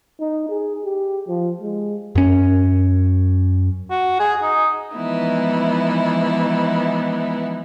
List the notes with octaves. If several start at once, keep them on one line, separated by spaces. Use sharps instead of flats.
D#4
G#4
G4
F3
G#3
F#2 C#4
F#4
G#4
D#4
E3 F3 G#3 B3 D#4 E4